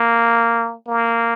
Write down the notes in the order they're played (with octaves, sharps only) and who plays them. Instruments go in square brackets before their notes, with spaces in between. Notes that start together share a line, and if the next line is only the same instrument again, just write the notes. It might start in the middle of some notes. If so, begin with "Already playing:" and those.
Already playing: [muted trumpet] A#3
A#3